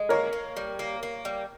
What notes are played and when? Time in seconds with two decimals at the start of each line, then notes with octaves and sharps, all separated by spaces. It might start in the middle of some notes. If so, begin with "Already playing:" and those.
Already playing: G#3
0.09 A#3 A#4 C#5
0.33 A#3
0.57 G3
0.79 A#3
1.03 A#3
1.25 G3